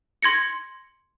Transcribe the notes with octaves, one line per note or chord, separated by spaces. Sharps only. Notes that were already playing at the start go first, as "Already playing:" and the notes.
C6 G#6 A#6 C#7